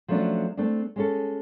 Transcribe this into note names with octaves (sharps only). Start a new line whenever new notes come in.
F3 F#3 A3 C#4 D4
A3 C4 D4
G#3 C#4 A4